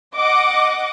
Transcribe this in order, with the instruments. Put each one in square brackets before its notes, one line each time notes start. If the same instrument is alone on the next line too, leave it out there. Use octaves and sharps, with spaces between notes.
[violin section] D#5 F#5 D6